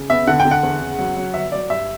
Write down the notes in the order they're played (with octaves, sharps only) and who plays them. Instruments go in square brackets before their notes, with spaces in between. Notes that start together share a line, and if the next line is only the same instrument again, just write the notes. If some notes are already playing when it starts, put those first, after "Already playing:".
Already playing: [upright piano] C#3
B3 E5
D3 F#5
G5
D3
F#5
E2
C#3
F#3
F#3
G1 E5
F#3 D5
G2 E5